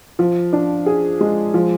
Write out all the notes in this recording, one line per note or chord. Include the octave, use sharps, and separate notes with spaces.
F3
D4
G#4
G#3
F3